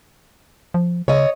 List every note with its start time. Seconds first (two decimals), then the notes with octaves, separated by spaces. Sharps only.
0.74 F3
1.08 C#3 C#5 D#5